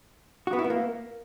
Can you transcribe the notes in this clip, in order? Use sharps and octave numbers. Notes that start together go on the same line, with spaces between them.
F#4
B3
E4
B3
A#3